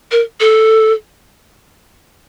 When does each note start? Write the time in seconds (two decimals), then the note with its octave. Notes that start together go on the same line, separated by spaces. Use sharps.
0.12 A#4
0.40 A4